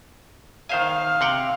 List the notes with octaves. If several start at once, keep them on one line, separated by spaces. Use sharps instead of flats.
D#3 C5 F5 G#5
C3 F#5 G5